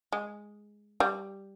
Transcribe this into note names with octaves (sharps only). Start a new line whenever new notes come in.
G#3
G3